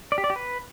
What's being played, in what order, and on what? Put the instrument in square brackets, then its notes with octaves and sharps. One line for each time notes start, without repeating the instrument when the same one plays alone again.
[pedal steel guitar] D5
G4
D5
G4
B4